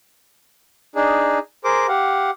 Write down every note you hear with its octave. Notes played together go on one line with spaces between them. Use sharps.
D4 D#4 G#4
G#4 A#4 C5 D6
G4 F5 F#5